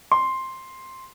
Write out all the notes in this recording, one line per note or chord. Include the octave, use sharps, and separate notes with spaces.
C6